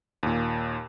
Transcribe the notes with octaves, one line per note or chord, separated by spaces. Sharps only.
D#2 A#2